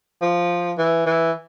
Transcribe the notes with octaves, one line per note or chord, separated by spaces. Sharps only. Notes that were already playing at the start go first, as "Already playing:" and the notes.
F3
E3
E3